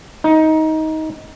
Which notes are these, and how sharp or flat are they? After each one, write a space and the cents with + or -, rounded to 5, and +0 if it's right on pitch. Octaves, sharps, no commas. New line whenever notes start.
D#4 +20